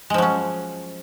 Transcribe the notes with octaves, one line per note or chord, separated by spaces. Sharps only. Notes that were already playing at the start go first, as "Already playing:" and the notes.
F3 F#3 G#3 C#4